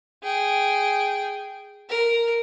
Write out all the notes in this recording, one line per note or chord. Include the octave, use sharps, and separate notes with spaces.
G#4 G5
A#4